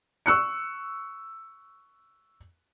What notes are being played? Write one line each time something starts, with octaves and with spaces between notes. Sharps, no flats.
C#6 E6 F#6 C#7